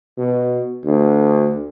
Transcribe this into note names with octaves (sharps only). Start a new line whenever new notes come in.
B2
D2